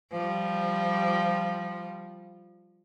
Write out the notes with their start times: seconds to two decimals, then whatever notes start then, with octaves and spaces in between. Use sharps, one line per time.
0.12 F3 G3